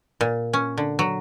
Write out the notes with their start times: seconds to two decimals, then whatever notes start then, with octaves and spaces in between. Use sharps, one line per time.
0.21 A#2
0.53 C#4
0.78 D3
0.99 F#3